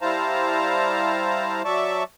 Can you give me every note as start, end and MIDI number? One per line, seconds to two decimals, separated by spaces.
0.01 1.62 55
0.01 1.62 64
0.01 1.62 72
0.01 1.62 77
0.01 1.62 81
0.01 1.62 82
1.65 2.03 54
1.65 2.03 74
1.65 2.03 76
1.65 2.03 81
1.65 2.03 85